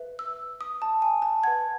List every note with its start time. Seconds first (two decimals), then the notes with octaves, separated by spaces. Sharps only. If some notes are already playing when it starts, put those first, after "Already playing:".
Already playing: B4 E5
0.19 E6
0.61 D#6
0.82 A5
1.02 G#5
1.22 A5
1.44 B4 F#5 G#6